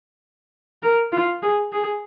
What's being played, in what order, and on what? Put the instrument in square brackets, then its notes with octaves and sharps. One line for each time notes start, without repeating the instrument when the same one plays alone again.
[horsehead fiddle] A#4
F4
G#4
G#4